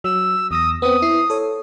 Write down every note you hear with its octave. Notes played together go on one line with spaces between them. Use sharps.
F#3 E6
E2 D#6 E6 A#6
B3 C4 D#6
E4 C7
A4 C#5